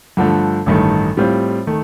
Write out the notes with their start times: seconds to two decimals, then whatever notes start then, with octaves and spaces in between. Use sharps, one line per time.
0.17 G2 D3 F3 A3
0.66 A1 G2 D#3 A3
1.17 A2 G3 C4 F4
1.67 D#3 A3